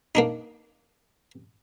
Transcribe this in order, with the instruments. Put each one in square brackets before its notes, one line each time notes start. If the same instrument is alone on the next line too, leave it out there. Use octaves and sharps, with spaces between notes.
[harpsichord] A#3 D4 D#4